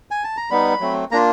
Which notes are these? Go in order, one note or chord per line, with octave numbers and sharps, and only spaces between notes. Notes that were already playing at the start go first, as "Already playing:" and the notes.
G#5
A5
A#5
G3 B3 D#4 B5
F#3 A3 C4
A#3 D4 F4 A#5